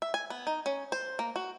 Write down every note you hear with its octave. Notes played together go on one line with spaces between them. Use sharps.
E5
G#5
B3
D#4
C#4
C5
A#3
F#4